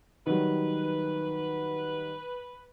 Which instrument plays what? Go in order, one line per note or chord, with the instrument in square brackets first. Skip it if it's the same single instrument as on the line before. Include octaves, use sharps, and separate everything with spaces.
[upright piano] D#3 F#3 G3 [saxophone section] B4